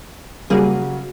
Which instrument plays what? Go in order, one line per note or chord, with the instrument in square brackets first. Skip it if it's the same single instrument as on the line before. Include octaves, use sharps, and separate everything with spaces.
[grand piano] C#3 F#3 F#4 [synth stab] G3 A#3 G#4